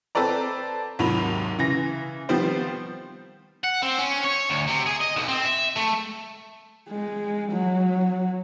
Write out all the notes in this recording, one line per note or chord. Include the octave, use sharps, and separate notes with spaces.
C4 A4 B4 D5 A#5
D#2 G#2 C3 F#3 B5 F7
C#3 E3 A#6
D#3 F3 G3 B3 C4 C5
F#5
C4
C#4
C#5
D2
C3
G#4
D#5
B1
C4
E5
A3
G#3
F#3